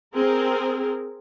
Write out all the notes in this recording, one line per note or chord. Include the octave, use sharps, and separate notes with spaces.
C4 G#4 A#4